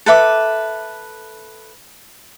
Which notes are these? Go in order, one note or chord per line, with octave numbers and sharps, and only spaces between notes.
A4 B4 E5 D6